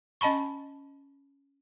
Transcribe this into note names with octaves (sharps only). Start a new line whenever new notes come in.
C#4 D#5 A5 B5 C#6